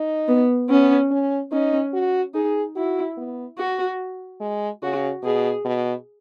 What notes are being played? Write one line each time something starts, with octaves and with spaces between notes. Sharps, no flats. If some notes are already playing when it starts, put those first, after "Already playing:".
Already playing: D#4
B3
B3 C#4
C#4
C#4 D#4
F#4
D#4 G#4
E4 F#4
B3
F#4
G#3
C#3 F#4
B2 G#4
B2